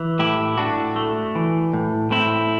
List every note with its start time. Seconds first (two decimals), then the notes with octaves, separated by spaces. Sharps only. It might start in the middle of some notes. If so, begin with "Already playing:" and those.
Already playing: E3
0.19 A2 E4 G4
0.58 A2 D4 F#4
0.96 A3
1.35 E3
1.74 A2
2.11 A2 C4 E4